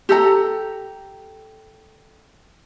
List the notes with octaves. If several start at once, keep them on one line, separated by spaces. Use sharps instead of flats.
G4 A4 A#5